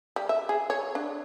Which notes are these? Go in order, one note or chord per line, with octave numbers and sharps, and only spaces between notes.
G3
E5
G#4
C#5
D4